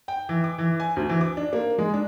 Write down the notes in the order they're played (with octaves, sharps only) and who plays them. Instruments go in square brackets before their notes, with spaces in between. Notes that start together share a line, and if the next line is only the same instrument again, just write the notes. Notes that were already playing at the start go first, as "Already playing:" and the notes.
[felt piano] G5
E3
D6
E3
G#5
D2
E3
D6
D4
A#3
G#3
D4